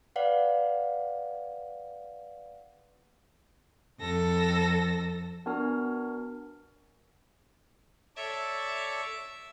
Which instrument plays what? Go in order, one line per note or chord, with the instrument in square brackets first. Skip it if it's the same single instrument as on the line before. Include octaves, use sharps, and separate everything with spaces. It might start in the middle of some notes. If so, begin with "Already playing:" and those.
[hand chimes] B4 D5 F5 F#5
[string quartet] F2 A4 A#6
[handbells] B3 D4 F#4 A#4 G#5 F6
[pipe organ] A4 C#5 D5 [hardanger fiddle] E5